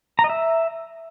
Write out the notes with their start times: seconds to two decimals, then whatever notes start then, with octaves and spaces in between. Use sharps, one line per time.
0.19 A#5
0.24 D#5
0.30 E5